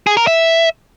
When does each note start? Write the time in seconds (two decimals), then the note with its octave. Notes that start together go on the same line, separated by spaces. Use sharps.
0.07 G#4
0.17 A#4
0.27 E5